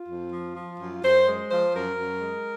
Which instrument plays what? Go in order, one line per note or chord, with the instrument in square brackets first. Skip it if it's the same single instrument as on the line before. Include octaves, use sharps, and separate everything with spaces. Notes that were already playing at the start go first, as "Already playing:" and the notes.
Already playing: [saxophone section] F4
F2
F3
F3
F#2
F#2 C5
G#3
F3 C5
F#2 A#4
F#2
G#3